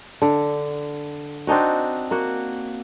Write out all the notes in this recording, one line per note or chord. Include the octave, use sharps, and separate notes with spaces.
D3
C4 D4 D#4 F#4
A#3 F#4